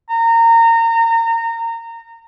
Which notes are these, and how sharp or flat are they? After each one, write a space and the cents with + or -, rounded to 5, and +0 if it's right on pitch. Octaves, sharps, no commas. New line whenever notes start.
A#5 -25